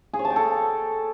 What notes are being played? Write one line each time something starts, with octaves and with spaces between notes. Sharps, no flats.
G#4
C#5
A5
G5
A4